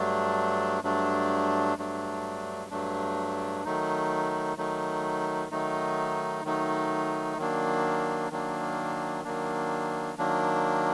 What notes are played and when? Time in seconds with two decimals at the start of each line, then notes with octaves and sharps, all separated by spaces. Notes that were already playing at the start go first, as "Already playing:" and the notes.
Already playing: G2 F#3 A3 D4
0.83 G2 F#3 A3 D4
1.77 G2 F#3 A3 D4
2.70 G2 F#3 A3 D4
3.65 D#3 F#3 A3 D#4
4.57 D#3 F#3 A3 D#4
5.51 D#3 F#3 A3 D#4
6.45 D#3 F#3 A3 D#4
7.38 D#3 F#3 A#3 D4
8.31 D#3 F#3 A#3 D4
9.24 D#3 F#3 A#3 D4
10.18 D#3 F#3 A#3 D4